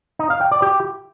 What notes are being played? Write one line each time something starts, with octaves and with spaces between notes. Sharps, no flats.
D#4
F5
G5
D5
G4